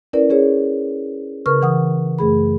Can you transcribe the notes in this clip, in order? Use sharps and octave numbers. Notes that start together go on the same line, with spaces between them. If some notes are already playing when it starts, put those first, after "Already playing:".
C#4 E4 A#4 B4 D5
C#4 G#4 C#5
C#3 A#4 B4 C#6 F6
E3 F#5 D#6
F#2 A3 G#4 B5